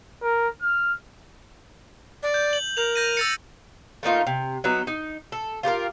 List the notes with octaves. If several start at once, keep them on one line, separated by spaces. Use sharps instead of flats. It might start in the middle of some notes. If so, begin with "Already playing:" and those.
A#4
F6
D5
G6
F#7
A#4 G6 F7
G6 A#6 D#7
E6 A6 C#7
A3 A#3 D#4 F4
C3
F#3 B3 D#4 E5
D#4
A4
F4 G4 A4 A#4